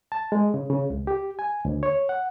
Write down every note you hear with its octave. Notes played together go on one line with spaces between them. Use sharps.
A5
G#3
C#3
C#3
C#2
G4
G#5
D2
C#5
F#5